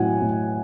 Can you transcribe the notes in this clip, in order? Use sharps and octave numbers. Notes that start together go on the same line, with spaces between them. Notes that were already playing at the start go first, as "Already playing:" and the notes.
Already playing: A2 F#3 F#5 G#5
A2